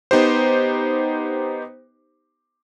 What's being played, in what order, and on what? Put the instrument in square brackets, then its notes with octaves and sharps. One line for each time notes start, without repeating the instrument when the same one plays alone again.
[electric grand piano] B3 D#4 G4 C5